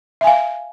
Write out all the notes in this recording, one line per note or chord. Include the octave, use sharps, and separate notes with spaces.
E5 F5 G#5